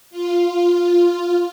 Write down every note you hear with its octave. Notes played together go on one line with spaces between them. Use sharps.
F4